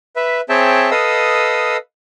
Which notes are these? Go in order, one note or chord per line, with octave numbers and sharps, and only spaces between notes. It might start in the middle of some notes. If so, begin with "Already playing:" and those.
B4 E5
C4 G#4 C#5 E5 G5 A5
A4 B4 D#5 F5 D#6 E6